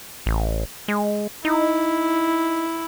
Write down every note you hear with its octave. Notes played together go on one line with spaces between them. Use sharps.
A1
G#3
D#4 E4